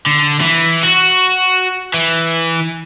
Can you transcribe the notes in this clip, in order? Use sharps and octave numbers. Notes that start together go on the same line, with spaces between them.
D3
E3
F#4
E3